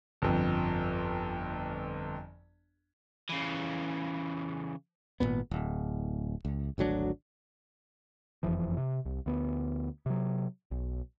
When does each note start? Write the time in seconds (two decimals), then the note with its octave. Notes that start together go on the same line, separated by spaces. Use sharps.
0.22 G1 F2
3.29 C#3 E3
5.20 G#1 F2 A#2 B3
5.51 D1
6.45 C#2
6.78 G#1 D2 F#3 D4
8.43 F#1 F2 E3 F3
8.77 C3
9.05 C2
9.26 D2 B3
10.06 C3 F#3
10.71 B1